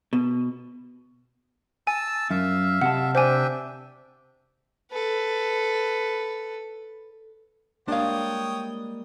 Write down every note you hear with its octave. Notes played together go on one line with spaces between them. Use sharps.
B2
G#5 A5 E6
F#2 E5 F5
C3 G4 F#5 A5
D4 C5 E5 G5 G#5
A4 B4
G3 G#3 A#3 D4 C#5 F5 G5 D#6